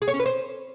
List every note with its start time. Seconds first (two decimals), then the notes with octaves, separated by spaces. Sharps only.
0.02 G#4
0.08 C#5
0.14 C#4
0.20 B4
0.26 C5